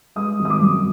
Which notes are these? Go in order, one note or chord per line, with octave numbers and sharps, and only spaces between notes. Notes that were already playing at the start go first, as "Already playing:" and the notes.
G#3 D#6
G#1
D#6
D6
F#2